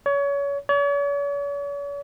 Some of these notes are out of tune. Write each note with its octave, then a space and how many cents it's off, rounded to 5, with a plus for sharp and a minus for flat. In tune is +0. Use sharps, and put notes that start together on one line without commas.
C#5 +30
C#5 +45